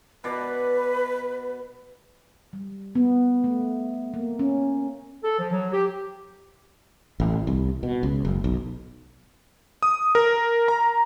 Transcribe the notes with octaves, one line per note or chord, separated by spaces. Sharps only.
B2 B4 D5
G3
B3
A3
A#3
C#4
A4
F3
F#3
G4
A1
C2
B2
C#2
F#1
B1
D#6
A#4
A#5